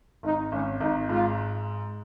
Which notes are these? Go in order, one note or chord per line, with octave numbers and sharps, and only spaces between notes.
G#1 D#4
G#1 C#4
G#1 D#4
G#2 F4